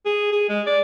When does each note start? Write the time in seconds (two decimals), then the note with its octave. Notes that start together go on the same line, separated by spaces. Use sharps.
0.06 G#4
0.32 G#4
0.49 G#3
0.67 D5